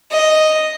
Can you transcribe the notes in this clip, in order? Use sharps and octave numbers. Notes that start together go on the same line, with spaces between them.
D#5